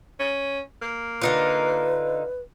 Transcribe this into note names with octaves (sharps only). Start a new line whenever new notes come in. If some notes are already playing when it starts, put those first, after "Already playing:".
C#4
A#3
D3 D#4 F4 B4